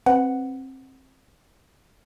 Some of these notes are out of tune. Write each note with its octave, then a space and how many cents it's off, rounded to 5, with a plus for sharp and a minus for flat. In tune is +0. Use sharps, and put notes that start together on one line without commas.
C4 +20 B4 +10 F#5 +0